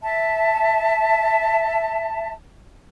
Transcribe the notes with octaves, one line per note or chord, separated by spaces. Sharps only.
E5 A5